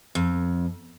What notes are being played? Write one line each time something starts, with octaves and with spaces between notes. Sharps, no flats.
F2